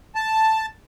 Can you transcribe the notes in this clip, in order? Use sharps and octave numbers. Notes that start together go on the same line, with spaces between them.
A5